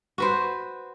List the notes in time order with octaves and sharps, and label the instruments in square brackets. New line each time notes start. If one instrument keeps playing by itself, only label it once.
[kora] F#4 B4 C5